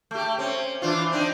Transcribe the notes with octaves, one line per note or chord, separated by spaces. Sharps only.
A3 G4
C4 C#4
E3 D4 F4
C4 D4 D#4